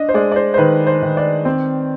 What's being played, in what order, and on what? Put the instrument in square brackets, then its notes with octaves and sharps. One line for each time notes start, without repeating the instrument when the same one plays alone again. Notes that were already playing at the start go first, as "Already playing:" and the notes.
Already playing: [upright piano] D4 D#5
C5
G#3 D5
D5
C5
C5
D#3 B4
C5
D#3
D5
C4